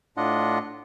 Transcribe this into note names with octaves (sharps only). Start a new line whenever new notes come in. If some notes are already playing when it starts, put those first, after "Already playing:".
A2 D4 F4 D#5 F#5